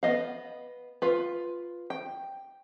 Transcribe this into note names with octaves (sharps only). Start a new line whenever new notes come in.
B3 D#5 F5
F4 B4
G5